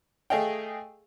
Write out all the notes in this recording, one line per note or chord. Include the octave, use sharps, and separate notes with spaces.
A3 G#4 D#5 F5 G5